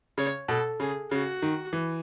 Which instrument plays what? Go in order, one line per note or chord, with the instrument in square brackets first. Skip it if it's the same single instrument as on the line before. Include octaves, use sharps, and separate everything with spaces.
[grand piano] C#3 [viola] C#5
[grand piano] B2 [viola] A4
[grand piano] C#3 [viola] G#4
[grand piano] C#3 [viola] F#4
[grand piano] D#3
E3